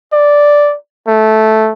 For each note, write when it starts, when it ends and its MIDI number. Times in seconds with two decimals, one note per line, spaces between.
0.13 0.75 74
1.07 1.73 57